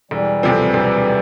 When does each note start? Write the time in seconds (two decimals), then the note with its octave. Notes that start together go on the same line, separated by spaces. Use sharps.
0.11 E1 E3 G3
0.43 D2 C3 F3 C4
0.74 E1